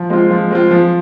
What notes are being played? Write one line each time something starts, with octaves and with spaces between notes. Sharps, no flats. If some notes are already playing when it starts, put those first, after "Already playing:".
Already playing: F3
G#3 C4 F4
F3
G#3 C4 F4
F3